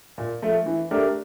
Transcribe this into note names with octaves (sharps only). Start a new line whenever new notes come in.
A#2
F3 A3
E3
A3 D4 G4 A#4